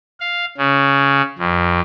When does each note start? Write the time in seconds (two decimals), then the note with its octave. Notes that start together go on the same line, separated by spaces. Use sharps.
0.20 F5
0.57 C#3
1.38 F2